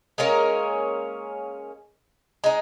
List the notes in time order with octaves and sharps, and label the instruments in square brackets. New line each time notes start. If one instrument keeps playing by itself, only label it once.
[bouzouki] G#3 A#3 C#4 A#4
G#3 D#4